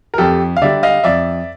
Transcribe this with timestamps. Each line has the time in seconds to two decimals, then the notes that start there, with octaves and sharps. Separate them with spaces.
0.14 A#4
0.18 F2 G4 A4
0.57 F5
0.61 D3 G3 D5 E5
0.83 D#5 F5
1.04 F2 D5 E5